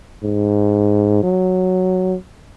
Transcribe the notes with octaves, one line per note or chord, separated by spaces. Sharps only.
G#2
F#3